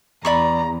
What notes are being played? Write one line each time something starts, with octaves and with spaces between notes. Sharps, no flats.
E2 D5 A#5 B5 C#6